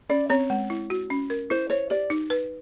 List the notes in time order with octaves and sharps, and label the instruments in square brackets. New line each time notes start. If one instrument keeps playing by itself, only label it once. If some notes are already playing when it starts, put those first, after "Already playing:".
[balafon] C#4 [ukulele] D5
[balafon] C4 [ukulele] C#5
[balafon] G#3
E4
F#4
C#4
A#4
[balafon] E4 [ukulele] C5
[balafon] C5 [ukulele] C#5
[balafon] G4 [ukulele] D5
[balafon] D#4
B4